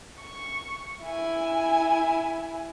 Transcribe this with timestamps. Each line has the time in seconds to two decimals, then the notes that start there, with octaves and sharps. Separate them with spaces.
0.20 C#6
1.03 E4 G#5